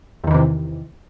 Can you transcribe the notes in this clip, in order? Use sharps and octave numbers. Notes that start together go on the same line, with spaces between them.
E2 C3 D#3 E3